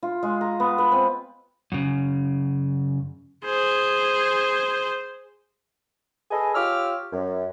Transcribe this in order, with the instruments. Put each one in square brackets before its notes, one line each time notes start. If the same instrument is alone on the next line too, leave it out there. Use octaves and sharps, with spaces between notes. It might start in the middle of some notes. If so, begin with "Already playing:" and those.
[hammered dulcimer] F4
G#3
A#5
B3
B4
C4
[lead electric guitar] F#2 C#3
[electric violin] G#4 C5
[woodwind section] G#4 A4 B4 D#5 G#5
F4 G4 C#5 D6 E6 F6
F#2